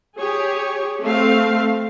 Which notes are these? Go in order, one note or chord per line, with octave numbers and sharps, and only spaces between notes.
G4 G#4 C#5
A3 C4 F5